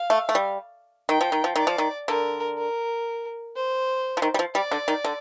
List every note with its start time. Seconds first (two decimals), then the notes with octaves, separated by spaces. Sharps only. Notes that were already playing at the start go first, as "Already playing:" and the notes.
Already playing: F5
0.10 A3
0.29 A3
0.35 G3
1.09 D#3 G5
1.21 F3
1.32 D#3
1.44 F3
1.56 D#3 D5
1.67 F3
1.78 D#3
2.08 D3 A#4
2.57 A#4
3.56 C5
4.17 F3
4.22 D#3
4.34 G3
4.39 F3
4.54 G3 D5
4.71 D3
4.88 D#3
5.04 D3